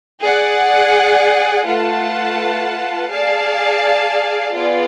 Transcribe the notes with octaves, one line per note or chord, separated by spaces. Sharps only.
G#4 D5 F#5
A3 F4 B4 F#5 A5
G#4 D5 F5 A5
B3 F4 G#4 D5